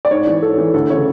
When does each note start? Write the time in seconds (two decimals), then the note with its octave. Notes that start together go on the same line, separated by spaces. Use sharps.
0.05 D5
0.11 G#2 C#5
0.27 E3
0.42 G#2 A4
0.58 E3
0.74 D2 A4
0.90 C#3 E3 C#5